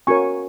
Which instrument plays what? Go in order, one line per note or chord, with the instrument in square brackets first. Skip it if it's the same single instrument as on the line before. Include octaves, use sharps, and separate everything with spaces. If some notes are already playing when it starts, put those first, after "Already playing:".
[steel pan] C#4 F#4 A#4 C#5 G#5 C#6